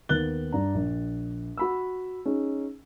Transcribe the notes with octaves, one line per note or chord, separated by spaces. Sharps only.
D#2 B3 F#6 A6 G7
G2 D5 A#5
A#1
F#4 B5 E6
C#4 D#4 G#4